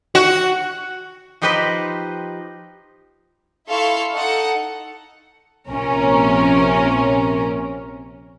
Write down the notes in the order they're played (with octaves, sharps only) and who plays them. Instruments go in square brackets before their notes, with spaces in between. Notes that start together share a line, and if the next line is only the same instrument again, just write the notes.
[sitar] F#4
[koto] F3 D#4 G4 B4 C5 D#5
[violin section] E4 A4 F5 C6 C#6
D#4 A4 F#5 C#7
[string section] A#1 C3 C#4 A#4